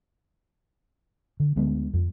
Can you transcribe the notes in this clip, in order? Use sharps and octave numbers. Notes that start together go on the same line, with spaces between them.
D3
D2 D3 G#3 B3
F2